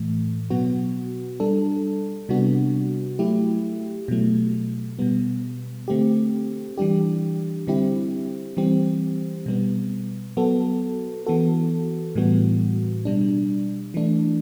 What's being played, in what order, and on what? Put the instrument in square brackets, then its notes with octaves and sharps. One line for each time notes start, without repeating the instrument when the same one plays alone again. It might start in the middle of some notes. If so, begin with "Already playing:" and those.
Already playing: [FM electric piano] A2 E3 A3
B2 F#3 B3 F#4
G3 D4 A4
C3 G3 B3 D4 F#4
F#3 A3 E4 G4
B2 F#3 A3
B2 G3 B3
D3 A3 C4 G4
E3 G3 D4 G4
D3 G3 C4 E4 G4
E3 G3 C4 G4
B2 G3 B3
F#3 B3 F#4 A4
E3 B3 F#4 A4
A2 E3 G3 B3 F#4
B2 G3 D4
E3 A3 D4